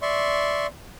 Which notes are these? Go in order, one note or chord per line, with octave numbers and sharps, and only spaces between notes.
D5 E5 C6 C#6